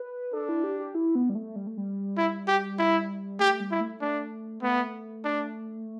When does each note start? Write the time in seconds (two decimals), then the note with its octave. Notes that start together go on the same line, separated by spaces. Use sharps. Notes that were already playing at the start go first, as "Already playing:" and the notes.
Already playing: B4
0.33 D4 A4
0.49 E4
0.64 G4
0.79 G4
0.95 E4
1.15 B3
1.29 G3
1.35 A3
1.56 G3
1.67 A3
1.77 G3
2.17 E4
2.48 G4
2.78 E4
3.40 A3 G4
3.60 G3
3.71 E4
3.81 A3
4.01 A3 D4
4.62 A3 B3
5.24 D4